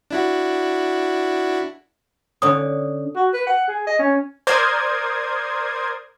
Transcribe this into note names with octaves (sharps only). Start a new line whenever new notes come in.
D4 E4 F#4
D3 C#4 D#6
F#4
B4
F#5
G#4
D#5
C#4
A#4 C5 D5 C6 D#6 G#6